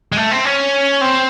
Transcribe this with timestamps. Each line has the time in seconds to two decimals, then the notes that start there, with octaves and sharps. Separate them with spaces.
0.12 G#3
0.17 A3
0.31 C4
0.45 C#4
1.01 C4